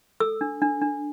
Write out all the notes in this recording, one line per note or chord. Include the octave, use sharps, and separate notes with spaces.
A4 E6
D4
D4
D4